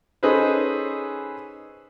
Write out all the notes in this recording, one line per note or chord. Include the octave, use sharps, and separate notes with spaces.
C#4 D#4 G#4 A4 B4 C5